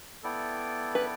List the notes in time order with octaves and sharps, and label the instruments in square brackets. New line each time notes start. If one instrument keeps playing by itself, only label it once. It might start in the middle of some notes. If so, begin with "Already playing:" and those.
[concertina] B3 E4 A4 D5 G5
[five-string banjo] B4